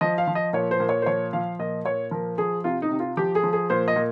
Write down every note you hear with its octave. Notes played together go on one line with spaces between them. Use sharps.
F3 D#5
F5
F3
D#5
A#2 C#5
C5
A#2
C#5
C5
F3 C#5
F3 F5
A#2 D#5
A#2 C#5
F3 A#4
F3 G#4
C3 F4
D#4
C3
F4
F3 G4
G#4
F3
G#4
A#2 C5
D#5
A#2